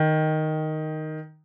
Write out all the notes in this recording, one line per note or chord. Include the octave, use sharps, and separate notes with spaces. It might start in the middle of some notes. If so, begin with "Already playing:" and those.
Already playing: D#3